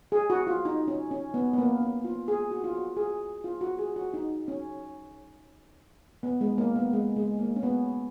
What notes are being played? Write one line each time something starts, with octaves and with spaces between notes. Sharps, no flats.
G#4
F#4
F4
D#4
C#4
C#4
B3
B3
A#3
C#4
F4
G#4
F#4
F4
F#4
G#4
F4
F#4
G#4
F#4
D#4
C#4
B3
G#3
A#3
B3
G#3
G#3
A#3
C#4
B3